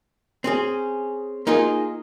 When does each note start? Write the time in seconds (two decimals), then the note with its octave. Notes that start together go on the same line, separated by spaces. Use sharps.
0.44 C4 C#4 G#4
1.47 A#3 D#4 F4 G#4